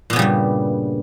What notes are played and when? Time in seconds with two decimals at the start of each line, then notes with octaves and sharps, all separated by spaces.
0.10 A#2
0.13 B3
0.16 C#3
0.19 G3
0.22 G2